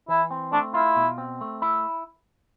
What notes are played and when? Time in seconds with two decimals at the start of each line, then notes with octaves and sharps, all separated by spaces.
0.08 E3 E4
0.31 C4
0.52 A3 D4
0.74 E4 F4
0.96 B2
1.18 C4
1.41 A3
1.62 E4